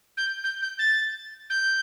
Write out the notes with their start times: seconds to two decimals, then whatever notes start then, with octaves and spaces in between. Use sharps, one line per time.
0.17 G6
0.44 G6
0.62 G6
0.79 A6
1.50 G6